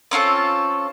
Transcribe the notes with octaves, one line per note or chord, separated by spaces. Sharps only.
C4 C#4 F4 A4